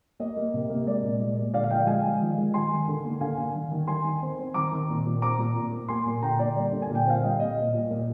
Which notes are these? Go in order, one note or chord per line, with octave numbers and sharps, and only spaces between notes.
A#3 D#5
A#3
C3
A#3
G#3 D5
A#2
G#3
A#2
D3 D5 F5
F5
F3 D#5 G5
G#3 F5 G#5
F3
D#3
G#3
D#3 G#5 C6
D#3
D3
A#3
D3 F5 G#5
D3
D#3
D#3
D#3 G#5 C6
D#3
C4
C4
D#3 A#5 D6
D#3
A#2
A#2
C4 A#5 D6
A#2
A#2
A#3
A#3 G#5 C6
A#2
D3 G5 A#5
A#3 D5
G3 D5
D3
G#5
A#2
G5
C4 F5
G3 D#5
A#2 D#5
A#2
A#2
A#2